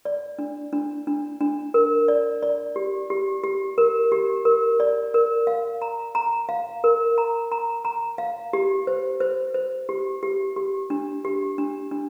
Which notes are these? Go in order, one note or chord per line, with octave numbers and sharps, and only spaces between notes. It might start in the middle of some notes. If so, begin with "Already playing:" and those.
D5
D4
D4
D4
D4
A#4
D5
D5
G4
G4
G4
A#4
G4
A#4
D5
A#4
F5
A#5
A#5
F5
A#4
A#5
A#5
A#5
F5
G4
C5
C5
C5
G4
G4
G4
D4
G4
D4
D4